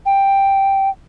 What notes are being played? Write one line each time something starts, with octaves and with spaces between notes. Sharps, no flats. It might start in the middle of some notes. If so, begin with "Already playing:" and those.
G5